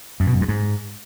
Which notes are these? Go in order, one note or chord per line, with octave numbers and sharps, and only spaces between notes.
F#2
B2
F#2
G2
G#2